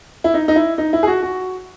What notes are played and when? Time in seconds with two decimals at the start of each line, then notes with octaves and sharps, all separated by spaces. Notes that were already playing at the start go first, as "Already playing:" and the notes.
0.24 E4
0.34 D#4
0.48 D#4
0.56 E4
0.78 D#4
0.93 E4
1.03 G#4
1.07 F#4
1.23 F#4